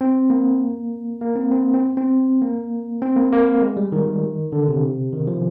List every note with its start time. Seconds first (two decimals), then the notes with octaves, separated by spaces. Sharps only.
0.01 C4
0.30 A#3
1.21 A#3
1.36 C4
1.51 C4
1.74 C4
1.97 C4
2.42 A#3
3.02 C4
3.16 A#3
3.32 A#3
3.62 G#3
3.77 G3
3.92 D#3
4.52 D3
4.68 C3
5.13 D#3
5.28 F3